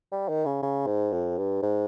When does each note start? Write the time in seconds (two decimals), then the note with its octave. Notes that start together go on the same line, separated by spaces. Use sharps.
0.12 G3
0.29 D#3
0.46 C#3
0.63 C#3
0.86 G#2
1.12 F2
1.38 G2
1.62 G#2